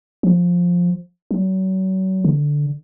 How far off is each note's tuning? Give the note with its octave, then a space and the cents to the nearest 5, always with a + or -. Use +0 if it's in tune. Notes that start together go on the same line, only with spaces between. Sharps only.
F3 +10
F#3 +35
D3 -5